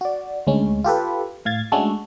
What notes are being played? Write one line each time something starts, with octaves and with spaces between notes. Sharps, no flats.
F#4 D5
D2 G#3 C#4
F4 G4 A4 B4
A2 F5 G#6 A6
G#3 A3 C#4 D4 F#4 A4